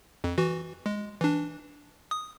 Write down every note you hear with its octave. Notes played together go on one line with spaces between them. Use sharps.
F2
E3 F#4
G#3
E3 D4
D#6